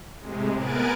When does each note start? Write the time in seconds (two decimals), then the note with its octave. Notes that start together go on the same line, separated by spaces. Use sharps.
0.18 A2 C3 G#3
0.56 B3 A#4 G#5 F#6 A6 D7